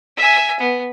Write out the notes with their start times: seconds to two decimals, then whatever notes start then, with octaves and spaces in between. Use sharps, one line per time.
0.16 E5 G#5
0.60 B3